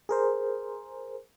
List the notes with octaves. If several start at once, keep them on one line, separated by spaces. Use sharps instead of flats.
G#4 A#4 C5